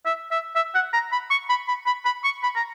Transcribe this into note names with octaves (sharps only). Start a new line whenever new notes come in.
E5
E5
E5
F#5
A#5
B5
C#6
B5
B5
B5
B5
C#6
B5
A#5